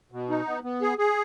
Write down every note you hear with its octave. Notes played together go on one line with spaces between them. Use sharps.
B2
D#4
B3
B3
G#4
G#4